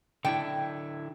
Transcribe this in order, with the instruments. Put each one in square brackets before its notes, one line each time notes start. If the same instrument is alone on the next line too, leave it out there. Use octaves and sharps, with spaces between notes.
[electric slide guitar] D3 D4 E4 [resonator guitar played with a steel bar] G5